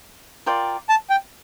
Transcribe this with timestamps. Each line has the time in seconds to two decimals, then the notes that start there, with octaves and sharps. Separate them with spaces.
0.46 F4 A#4 D5 G5
0.89 A5
1.10 G5